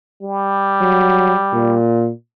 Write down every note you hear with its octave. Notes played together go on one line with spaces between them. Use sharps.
G3
F#3
A#2